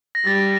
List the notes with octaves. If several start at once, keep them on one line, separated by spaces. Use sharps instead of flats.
A#6
G3 A6